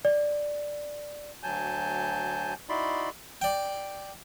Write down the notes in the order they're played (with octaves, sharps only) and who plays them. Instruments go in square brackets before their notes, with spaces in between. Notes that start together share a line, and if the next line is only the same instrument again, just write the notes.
[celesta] D5
[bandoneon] D2 F#3 G#5 A5 G6
D#4 E4 F#4 D5 B5 C6
[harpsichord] D5 G5